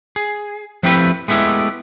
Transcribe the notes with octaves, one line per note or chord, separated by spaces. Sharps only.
G#4
F3 A3 C4 E4 G4 B4
G#3 A3 B3 E4 G4